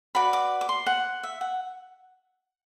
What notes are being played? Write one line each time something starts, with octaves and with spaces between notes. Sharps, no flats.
F#4 B4 D5 B5
D6
D6
C6
F#5
E5
F#5